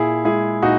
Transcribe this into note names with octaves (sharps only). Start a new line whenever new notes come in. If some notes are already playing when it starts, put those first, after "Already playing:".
Already playing: A#2 E4 G#4
G#3 E4 G#4
A#2 D#4 F#4